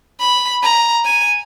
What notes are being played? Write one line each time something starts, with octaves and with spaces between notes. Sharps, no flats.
B5
A#5
G#5